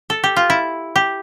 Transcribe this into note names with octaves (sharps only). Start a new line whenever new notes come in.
A4
G4
F4
E4
G4